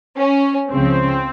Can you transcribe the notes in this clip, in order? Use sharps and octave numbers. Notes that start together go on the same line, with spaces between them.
C#4
C#2 C#3 F3 C4